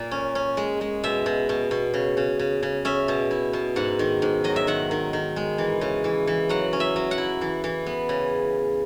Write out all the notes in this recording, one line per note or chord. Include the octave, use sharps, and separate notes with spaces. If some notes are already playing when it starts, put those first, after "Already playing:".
Already playing: A#2 A#3
C#4
C#4
G#3
G#3
B2 E5
B2
B2
B2
C#3
C#3
C#3
C#3
C#4 E5
B2
E4
B2
G#2 F#5
D#3
G#2
F#3 D#5
E5
D#3 F#5
D#3
D#3
G#3
E3
C#3
E3
E3
F#3 F#5
C#4
E5
F#3
F#5
E4
E3
E3
B3
C#3